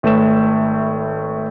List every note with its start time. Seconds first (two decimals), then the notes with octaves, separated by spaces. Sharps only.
0.03 G#1 A3 B4 C#5 E7